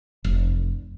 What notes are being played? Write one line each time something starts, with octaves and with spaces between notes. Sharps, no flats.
F1